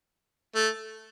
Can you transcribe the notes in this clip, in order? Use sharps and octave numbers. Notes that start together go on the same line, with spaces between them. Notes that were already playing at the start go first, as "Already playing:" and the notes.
A3